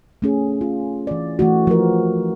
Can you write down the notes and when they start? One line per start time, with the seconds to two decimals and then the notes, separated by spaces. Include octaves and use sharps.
0.22 A3 C#4 G#4
0.61 F4
1.07 E3 D5
1.39 E3 A3 F#4
1.67 F3 A#4